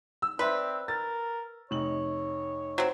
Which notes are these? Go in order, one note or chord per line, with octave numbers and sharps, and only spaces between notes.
E6
C4 B4 C5 D5 E5
A#4 A6
F1 D#4 C#5 F#7
F#3 C4